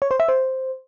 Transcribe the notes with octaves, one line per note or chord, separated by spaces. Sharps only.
C#5
C5
E5
C5